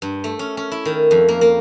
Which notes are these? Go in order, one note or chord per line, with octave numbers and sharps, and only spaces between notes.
G2
A3
C#4
C#4
E4
D#3
F2
A#3
A#3